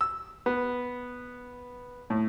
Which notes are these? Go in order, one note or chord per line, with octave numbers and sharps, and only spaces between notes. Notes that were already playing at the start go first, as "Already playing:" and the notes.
E6
B3
A2